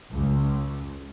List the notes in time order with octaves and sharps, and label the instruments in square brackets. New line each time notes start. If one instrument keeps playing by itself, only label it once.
[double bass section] C#2